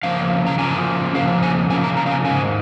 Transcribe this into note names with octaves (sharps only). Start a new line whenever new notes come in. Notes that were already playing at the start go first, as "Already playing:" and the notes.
C#3 F3 A#3 F5
A#5
C#3 F3 A#3 G#5
C#3 F3 A#3 F5
G#5
C#3 F3 A#3 G#5
A#5
A#5
F5
G#5
G#2 D#3 A#3 G#5